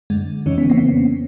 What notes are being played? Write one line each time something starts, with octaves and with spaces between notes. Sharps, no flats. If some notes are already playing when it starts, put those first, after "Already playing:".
F#2 D3 G#3
F2 C#3 E3 C#4 D#4
B3 C#4
A#3 C4